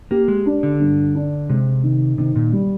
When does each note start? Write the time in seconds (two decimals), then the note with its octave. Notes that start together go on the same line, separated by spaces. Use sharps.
0.11 A#3 G4
0.28 G#3
0.46 D4
0.63 D3
0.80 G2
1.15 D4
1.49 C3 G#3
1.84 D#3
2.18 C3 D#3
2.36 A#2
2.52 G3